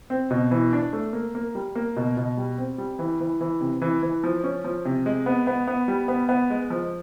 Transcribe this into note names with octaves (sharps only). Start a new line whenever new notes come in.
C4
B2
E3
D4
A3
A#3
A#3
G3
A#3
B2
B2
G3
C4
G3
E3
E3
E3
C3
E3
E3
F3
C#4
F3
C3
G#3
B3
B3
B3
G3
B3
B3
G#3
F3